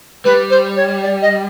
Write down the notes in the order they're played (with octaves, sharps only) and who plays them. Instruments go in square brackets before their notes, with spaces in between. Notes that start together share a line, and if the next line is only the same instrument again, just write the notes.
[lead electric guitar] G3 [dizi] B4
[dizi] C5
C#5
D5
D#5